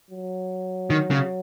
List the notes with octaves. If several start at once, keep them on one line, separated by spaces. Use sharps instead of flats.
F#3
D#3
C#3